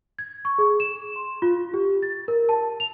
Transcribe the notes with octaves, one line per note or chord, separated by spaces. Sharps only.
G#6
C#6
G#4
E7
C6
F4
G4
A6
A#4
A5
F7